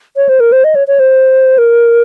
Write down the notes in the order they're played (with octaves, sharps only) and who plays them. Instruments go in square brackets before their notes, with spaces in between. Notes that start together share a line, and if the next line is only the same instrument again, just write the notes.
[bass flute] C#5
C5
A#4
C5
D#5
C#5
C#5
C5
A#4